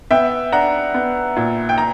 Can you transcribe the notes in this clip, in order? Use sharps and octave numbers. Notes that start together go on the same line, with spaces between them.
B3 E5 G5
D4 F#5 A#5
B3
A#2
G5
A#5